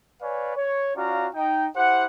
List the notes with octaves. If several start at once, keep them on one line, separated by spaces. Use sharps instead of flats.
B4 C#5 D5 F5 G#5
C#5
C#4 F4 F#4 D5 F5 A#5
D#4 G5
E4 G4 C5 F#5